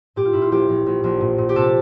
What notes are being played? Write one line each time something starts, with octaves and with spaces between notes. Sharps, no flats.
A#2 G4
F4
A#2 E4
F4
A#1 G4
A#1
A#1
A#1
A#2
A#2
G4
C3 A4